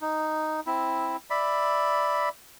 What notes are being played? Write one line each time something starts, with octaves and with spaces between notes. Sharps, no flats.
D#4
C4 E4
D5 E5 B5